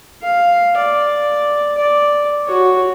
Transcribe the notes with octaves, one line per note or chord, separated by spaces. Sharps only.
F5
D5
D5
F#4 C#5